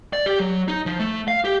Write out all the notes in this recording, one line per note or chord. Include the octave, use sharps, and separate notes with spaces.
D5
G4
F#3
D#4
F3
A3
F5
G4